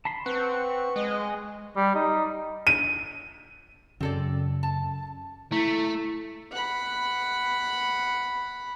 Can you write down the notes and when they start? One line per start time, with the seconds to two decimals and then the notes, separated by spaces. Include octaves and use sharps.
0.05 A5 B5 C6
0.26 C4 B4 F#5 C#6
0.96 G#3 D#5
1.76 G3
1.95 D#4
2.67 D#7
4.01 F#2 C#3 C4 A4 D5
4.63 A5
5.52 A3 E4 B6
6.52 F#5 B5